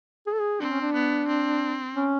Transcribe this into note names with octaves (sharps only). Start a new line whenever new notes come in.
G#4
A4
G#4
C4 D4
C#4
D4
B3
C4
C#4